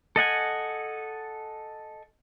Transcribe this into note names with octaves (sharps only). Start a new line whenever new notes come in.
A4 D#5 F#5 G#5